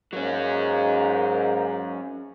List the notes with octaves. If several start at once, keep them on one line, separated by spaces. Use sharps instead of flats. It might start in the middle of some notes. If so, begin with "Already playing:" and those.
G#2 F#3 A#3 C#4